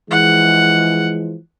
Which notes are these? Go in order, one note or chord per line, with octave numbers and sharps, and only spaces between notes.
E3 F3 G#3 F#5